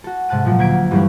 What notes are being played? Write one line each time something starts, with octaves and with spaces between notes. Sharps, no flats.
F#4 A4
G#2 C3 A5 F#6 D#7
A#2 F3 F#3
D2 A#3 G#6 B6 D7
G2 E3 G3 A3 C#4 D4